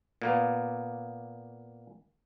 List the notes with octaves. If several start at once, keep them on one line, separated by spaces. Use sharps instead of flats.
A#2 A#3 B3